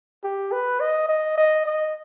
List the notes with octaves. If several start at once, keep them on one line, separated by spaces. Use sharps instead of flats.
G4
B4
D#5
D#5
D#5
D#5